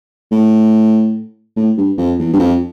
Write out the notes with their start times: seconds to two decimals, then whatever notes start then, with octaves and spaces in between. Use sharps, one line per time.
0.32 A2
1.57 A2
1.77 G2
1.98 F2
2.19 E2
2.34 G2
2.40 F2